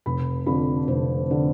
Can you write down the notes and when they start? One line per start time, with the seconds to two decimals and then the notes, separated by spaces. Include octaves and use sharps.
0.06 F1 B5
0.46 F2 D3 B5
0.87 F1 C5
1.31 D3